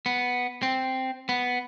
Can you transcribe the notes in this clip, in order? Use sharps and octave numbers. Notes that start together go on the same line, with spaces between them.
B3
C4
B3